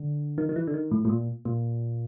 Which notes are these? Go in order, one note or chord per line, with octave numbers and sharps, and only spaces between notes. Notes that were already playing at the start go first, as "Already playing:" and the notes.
Already playing: D3
D#3
D#3
E3
D3
D#3
A2
A2
A#2
A#2